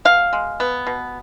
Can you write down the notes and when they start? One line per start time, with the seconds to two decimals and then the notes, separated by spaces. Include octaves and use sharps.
0.05 B2 F5
0.33 G#3
0.60 B3
0.87 B2